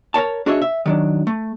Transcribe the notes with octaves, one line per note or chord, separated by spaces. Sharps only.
A#4 C5 C#5 A5
D4 F#4 G#4 C#5 D#5 E5
E5
D#3 F#3 D4
A3